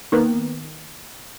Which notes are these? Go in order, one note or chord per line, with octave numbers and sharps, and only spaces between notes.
D#3 A#3 B3